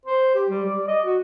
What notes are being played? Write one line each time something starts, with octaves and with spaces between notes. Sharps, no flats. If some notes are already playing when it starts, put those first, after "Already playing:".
C5
G4
G3
D5
D#5
F#4